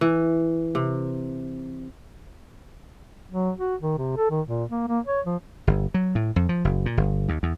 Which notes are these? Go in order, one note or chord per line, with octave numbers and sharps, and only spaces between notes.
E3
C3
F#3
F#4
D#3
C3
A4
D#3
A#2
A#3
A#3
C#5
F3
G1
F#3
A2
F2
F3
F#1
A#2
G1
D#2
E2